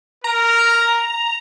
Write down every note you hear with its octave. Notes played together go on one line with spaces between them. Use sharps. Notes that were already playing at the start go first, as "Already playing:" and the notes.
A#4 A#5